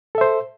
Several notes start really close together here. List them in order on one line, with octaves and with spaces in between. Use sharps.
A4 E5 C5